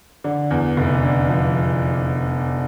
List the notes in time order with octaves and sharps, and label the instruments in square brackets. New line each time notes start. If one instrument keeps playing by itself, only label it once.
[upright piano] D3
E2
F1
D3
F3